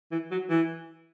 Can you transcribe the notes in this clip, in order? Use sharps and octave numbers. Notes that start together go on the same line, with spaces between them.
E3
F#3
E3